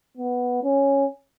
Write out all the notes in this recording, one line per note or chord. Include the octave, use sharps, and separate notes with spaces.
B3
C#4